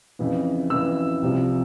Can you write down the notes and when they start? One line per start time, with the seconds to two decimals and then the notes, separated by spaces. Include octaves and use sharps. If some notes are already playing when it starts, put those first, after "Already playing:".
0.19 F2 C#3 E3
0.70 F2 C#3 E3 E6
1.22 C2 C3 F3